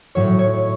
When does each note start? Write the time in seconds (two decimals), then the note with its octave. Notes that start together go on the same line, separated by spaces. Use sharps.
0.15 A2 F#3 C#5
0.39 C#5